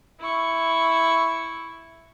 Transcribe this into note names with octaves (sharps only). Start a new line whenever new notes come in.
E4 C#6